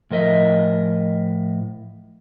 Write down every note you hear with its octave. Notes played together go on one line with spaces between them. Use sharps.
A2 F3 A#4 D#5 E5